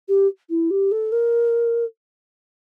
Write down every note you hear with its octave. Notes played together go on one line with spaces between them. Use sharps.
G4
E4
G4
A4
A#4